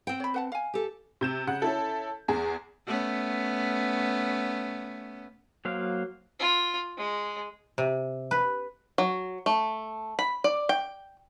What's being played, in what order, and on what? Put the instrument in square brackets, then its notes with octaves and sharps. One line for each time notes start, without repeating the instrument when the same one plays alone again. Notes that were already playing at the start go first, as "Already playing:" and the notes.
[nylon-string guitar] C4 G5
[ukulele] C#5 B5
B4 F#5 A5
F5 G#5
[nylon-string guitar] G4 A4
[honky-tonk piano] C3 G6 E7
C#3 F#5
C#4 E4 A4
E2 G#4
[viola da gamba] A3 B3 C#4
[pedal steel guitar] F#3 A#3 C5 F5
[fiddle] F4
G#3
[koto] C3
B4
[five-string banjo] F#3
A3
B5
D5
G5